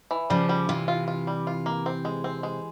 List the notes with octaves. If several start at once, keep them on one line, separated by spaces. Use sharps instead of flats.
E3
C#3 F3 G3
G3
C3 E3 F4
F4
F4
G3
F4
A#3
C4
G#3
C4
G#3